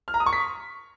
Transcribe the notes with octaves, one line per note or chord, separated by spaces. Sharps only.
F6
A#5
D#6
C#6
B6